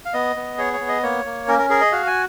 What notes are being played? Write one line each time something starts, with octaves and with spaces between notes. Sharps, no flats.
F5
B3 D#5
B3
G#4 C#5
C#5
B3
D#5
A#3 C#5
A#3
C#4 A#4
A#4
G#4 A#4
D#5
F#4 F5
G#5